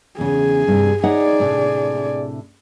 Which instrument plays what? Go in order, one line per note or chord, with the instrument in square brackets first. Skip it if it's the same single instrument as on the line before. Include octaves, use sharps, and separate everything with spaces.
[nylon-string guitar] E2 C#3 [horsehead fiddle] G#4
[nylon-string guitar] G2 C3
[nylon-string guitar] D#4 C#5 F#5 [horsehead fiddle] G#4 D5
[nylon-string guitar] A2 C3 D4